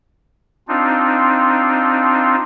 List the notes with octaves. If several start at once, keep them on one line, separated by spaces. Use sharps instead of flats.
C4 D4 D#4 F4